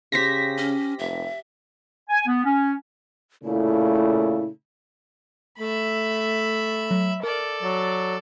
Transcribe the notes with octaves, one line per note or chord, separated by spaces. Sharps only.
C#3 G4 C5 C#6 A#6 B6
C#4
F1 E5
G#5
B3
C#4
A#2 C#3 A3 E4
A3 E5 B5
F#3
A4 A#4 D5
F#3 A6